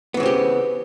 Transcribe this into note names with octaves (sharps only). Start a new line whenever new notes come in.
C#3 E3 B3 C4 G4